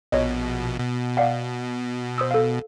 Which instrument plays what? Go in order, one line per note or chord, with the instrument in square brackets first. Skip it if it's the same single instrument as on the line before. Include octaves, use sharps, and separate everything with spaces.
[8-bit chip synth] A#1 B2 [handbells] C#5 D#5
[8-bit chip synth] B2
[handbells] D5 F5 F#5
C5 D#6 E6
A4 F5